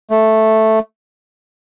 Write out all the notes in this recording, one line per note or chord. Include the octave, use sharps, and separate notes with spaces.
A3